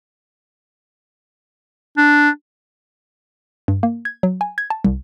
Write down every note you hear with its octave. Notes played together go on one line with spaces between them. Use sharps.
D4
G2
A#3
G#6
F#3
G#5
G#6
A5
C2